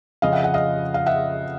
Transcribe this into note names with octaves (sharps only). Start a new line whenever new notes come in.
F2 C#3 F3 D#5 F5
E5 F#5
E5 F#5
D#5 F5
F5
E5 F#5